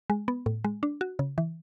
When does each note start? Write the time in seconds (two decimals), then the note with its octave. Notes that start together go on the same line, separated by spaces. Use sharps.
0.10 G#3
0.28 B3
0.46 A2
0.64 G#3
0.83 D4
1.01 F#4
1.19 C#3
1.38 E3